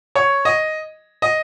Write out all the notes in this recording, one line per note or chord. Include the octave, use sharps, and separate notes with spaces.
C#5
D#5
D#5